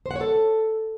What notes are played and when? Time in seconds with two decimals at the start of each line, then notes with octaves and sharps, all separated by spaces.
0.06 C5
0.11 F#5
0.16 C#5
0.21 A4